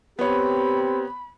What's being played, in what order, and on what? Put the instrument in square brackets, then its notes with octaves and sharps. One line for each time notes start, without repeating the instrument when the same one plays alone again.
[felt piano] B3 C#5 [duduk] C4 [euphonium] G4 [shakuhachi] B5